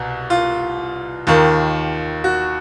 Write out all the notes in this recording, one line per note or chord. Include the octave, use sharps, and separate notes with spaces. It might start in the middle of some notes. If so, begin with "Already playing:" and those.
Already playing: C2 B2
F4
D#2 D#3 F4
F#4